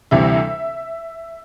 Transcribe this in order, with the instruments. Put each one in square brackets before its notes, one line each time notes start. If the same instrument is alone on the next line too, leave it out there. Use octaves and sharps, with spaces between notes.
[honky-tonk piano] D2 C3 E3 G3 E5